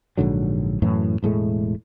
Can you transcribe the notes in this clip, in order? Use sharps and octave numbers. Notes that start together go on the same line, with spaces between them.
A#1 G#2 D3 F#3
F#2 A2 E3
E1 A2 G#3 A3